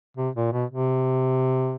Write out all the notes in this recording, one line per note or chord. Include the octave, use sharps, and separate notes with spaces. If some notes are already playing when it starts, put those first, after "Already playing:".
C3
A#2
B2
C3